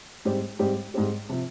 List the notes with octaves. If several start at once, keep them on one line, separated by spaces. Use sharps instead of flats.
G#2 G3 C4 G4
G#2 G3 C4 G4
G#2 G3 C4 G4
C3 F3